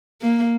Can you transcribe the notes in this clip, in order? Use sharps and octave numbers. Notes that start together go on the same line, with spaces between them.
A#3